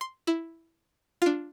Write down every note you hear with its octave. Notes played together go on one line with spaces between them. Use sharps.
C6
E4
D4 F4